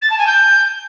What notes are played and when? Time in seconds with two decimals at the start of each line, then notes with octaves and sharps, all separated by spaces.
0.01 A6
0.10 A5
0.18 G#5
0.26 G6